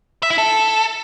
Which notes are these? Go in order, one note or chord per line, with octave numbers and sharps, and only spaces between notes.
E5
E4
A4